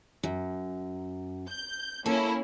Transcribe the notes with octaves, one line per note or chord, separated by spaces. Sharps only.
F#2
G6
A#3 C#4 E4 A4